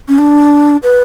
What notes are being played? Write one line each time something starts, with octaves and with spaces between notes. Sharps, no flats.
C#4
D4
B4